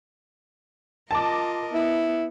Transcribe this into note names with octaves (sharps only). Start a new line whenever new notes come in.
F4 A#4 D#5 A5 D6
B3 E4